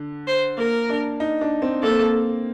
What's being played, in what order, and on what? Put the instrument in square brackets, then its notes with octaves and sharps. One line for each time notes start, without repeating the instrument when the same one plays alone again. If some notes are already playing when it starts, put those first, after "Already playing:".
Already playing: [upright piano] D3
[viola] C5
[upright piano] A#3 [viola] A#4
[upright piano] D4
D#4
D4
C4
[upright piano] A#3 [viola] A4
[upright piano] C4
A#3